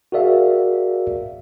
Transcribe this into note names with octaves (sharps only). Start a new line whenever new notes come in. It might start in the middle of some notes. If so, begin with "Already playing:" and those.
F#4 G#4 A#4 D5 E5 F5